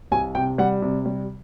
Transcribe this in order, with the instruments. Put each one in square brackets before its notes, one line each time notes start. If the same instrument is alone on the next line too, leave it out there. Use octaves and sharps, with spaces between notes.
[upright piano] C2 G#5
C3 G5
G3 F#5
C3
G3